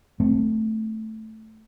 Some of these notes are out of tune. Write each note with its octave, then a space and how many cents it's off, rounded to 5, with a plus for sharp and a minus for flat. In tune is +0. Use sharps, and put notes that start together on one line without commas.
A3 +0 C4 +0